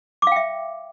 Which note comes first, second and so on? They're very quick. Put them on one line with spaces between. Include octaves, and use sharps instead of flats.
D6 F5 G5 E5